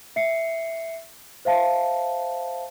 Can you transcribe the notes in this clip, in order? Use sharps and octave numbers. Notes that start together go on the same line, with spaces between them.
E5 C7 C#7
C5 E5 F5 A5